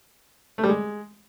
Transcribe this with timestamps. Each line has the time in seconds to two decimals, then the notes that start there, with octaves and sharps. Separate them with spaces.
0.58 A3
0.64 G3
0.69 G#3